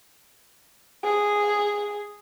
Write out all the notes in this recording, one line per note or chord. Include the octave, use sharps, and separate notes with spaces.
G#4